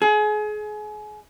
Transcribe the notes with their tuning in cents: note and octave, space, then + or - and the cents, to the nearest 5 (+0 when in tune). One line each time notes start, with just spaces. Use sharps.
G#4 +30